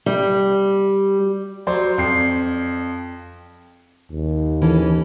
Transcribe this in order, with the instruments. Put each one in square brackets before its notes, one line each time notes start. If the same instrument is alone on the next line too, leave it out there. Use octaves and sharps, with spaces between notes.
[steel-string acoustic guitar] G3
[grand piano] F#3 C5 D5 C6
F2 C7
[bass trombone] D#2
[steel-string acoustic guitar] E3 C#4 A4